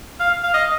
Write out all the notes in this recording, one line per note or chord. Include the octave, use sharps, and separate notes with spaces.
F5
F5
D#5